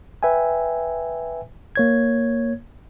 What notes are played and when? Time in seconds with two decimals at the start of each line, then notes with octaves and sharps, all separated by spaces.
0.23 B4 E5 G5 G#5
1.76 A#3 C#5 G#6